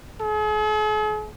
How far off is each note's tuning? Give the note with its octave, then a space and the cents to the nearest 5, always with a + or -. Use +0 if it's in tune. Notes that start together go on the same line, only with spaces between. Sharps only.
G#4 +45